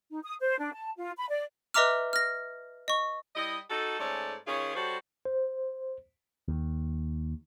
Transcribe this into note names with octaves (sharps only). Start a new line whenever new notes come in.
D#4
D#6
C5
D4
A5
F4
B5
D5
B4 D#5 E5 A#5 D6 F6
F6 A#6
D#5 C#6
G3 E4 D#5
D#4 F#4 A4
G#2 A3 C#4 A4 D5
D#3 C#4 F4 G#4 C#5
G3 F#4 A4 C5 C#5
C5
D#2